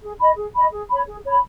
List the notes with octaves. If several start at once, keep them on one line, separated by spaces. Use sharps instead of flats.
G#4
D#5 B5
G#4
D#5 B5
G#4
C#5 B5
G#4
C#5 B5